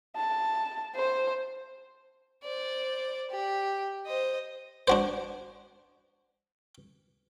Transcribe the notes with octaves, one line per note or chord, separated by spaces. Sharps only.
A5
C5
C5 D5
G4
C5 D#5
D4 F#4 C5